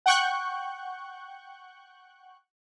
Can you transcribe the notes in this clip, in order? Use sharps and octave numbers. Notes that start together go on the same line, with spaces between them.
F#5 G5 C#6 F#6 G6